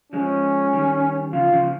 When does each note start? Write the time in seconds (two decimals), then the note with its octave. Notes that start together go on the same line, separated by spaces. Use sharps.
0.13 F3 G#3 C#4
0.73 D#3 G3
1.33 C#3 F3 F4
1.53 C#3 F3